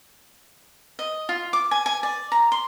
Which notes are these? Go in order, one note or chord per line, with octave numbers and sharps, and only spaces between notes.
D#5
F4
D6
G#5
G#5
D5
A#5
C6